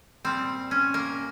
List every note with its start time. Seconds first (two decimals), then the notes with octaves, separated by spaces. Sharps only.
0.25 A#2 G3 C4
0.71 C#4
0.94 A#3